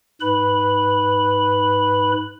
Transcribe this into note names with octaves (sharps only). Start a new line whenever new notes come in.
G#2 B4 B5